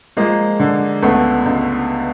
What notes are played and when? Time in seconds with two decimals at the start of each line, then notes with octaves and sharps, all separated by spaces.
0.17 F3 G#3 A#3
0.60 D3
1.02 C#2 A3 B3
1.45 C#2